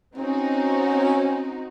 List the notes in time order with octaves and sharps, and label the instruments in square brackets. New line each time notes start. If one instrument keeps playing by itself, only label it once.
[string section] C4 D#4 F#4 [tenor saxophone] C#4